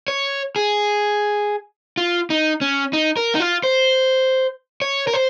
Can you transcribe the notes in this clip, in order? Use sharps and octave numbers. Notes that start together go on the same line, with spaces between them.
C#5
G#4
F4
D#4
C#4
D#4
A#4
D#4
F4
C5
C#5
A#4
C5